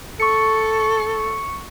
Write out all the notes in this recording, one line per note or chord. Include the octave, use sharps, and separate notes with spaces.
A4 C#6 C#7